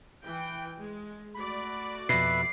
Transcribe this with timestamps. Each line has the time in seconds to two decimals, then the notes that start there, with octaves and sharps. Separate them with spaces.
0.24 E3 G5
0.78 G#3
1.35 A3 F#4 D5 B5
2.09 F2 B2 B4 E5 C7